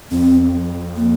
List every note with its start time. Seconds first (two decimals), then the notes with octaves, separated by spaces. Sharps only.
0.11 F2 C4
0.96 A#3